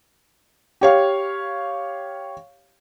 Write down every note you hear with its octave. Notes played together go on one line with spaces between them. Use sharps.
G4 C#5 F5